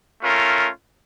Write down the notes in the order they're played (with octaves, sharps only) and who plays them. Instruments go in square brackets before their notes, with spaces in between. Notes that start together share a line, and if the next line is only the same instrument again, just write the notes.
[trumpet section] A3 C#4 F4 A#4